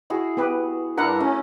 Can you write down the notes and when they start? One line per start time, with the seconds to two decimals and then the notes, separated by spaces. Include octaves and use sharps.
0.10 E4 F#4 G#4
0.37 B3 G4 B4
0.97 G2 D4 E4 A#4 F#5 A#5 D#6
1.20 A3 C#4